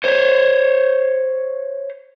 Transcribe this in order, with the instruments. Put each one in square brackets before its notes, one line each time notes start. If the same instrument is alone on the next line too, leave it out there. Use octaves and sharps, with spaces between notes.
[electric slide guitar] C5 C#5